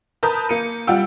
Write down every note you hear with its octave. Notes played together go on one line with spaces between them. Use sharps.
A#4 B4 A5 D#6 G6
A#3 C#7 D#7
G3 F4 F#5 G5 E6